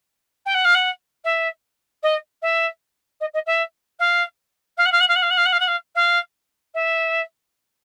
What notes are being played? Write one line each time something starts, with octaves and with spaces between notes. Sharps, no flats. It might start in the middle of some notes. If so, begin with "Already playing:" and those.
G5
F#5
F5
F#5
E5
D#5
E5
D#5
D#5
E5
F5
F5
F#5
F5
F#5
F5
F#5
F5
F#5
F5
F#5
F5
F#5
F5
F5
E5